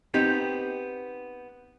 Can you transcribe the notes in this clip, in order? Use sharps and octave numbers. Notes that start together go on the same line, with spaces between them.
B3 C4 D#4 G4